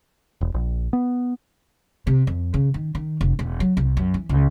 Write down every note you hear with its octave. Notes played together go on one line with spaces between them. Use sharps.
E1
A#1
B3
C3
F2
C#3
D#3
D#3
F1
E1
F#3
C2
F#2
E3
C#2